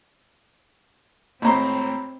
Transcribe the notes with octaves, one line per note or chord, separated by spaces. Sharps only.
G#1 A2 C4 C5 A#5 B5